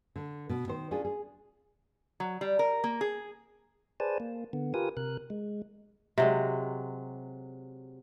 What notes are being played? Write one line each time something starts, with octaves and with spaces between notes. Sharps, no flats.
D3
B2
D#3 C5
C#4 D4 F4 G#4
G#4
F#3
G3
A#4
A#3
G#4
G#4 B4 C5 D5 G#5 A5
A#3
D3 B3
F4 G4 A#4 B4 G#5 D#6
C3 A#4 F#6
G#3
C3 F#3 G#3